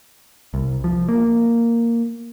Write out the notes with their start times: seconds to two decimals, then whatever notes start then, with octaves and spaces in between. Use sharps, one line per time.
0.54 C2
0.84 F3
1.09 A#3